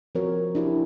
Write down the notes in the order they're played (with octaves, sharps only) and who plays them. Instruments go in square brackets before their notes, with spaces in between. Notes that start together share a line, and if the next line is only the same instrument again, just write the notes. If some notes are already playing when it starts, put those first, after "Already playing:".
[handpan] F3 C4 F#4 A#4 C#5
D4 E4 G4